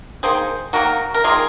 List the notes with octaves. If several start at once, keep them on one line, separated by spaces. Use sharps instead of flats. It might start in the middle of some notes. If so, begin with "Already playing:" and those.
D#3 A#3 G#4 C5
D#3 A#3 F#4 A#4
A#4
D#3 A#3 F4 G#4